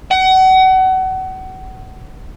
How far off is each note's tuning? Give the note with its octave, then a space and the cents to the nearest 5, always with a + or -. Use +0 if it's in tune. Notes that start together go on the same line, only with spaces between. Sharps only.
F#5 +30